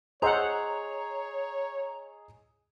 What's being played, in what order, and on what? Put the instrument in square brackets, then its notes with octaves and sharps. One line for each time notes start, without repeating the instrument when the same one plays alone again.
[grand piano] G#4 D#5 E6 [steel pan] C5 F#5 [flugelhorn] C#5 [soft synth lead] A#5